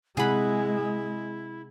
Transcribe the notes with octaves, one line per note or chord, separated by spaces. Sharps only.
C3 G#3 E4 G#4 F#5 B5